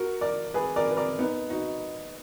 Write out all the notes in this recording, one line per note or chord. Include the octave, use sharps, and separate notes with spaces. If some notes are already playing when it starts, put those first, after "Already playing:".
Already playing: F#4 A#4
A#4 D5
G#4 B4
A#4 D5
B4
A#4 D5
B3 D#4
D#4 F#4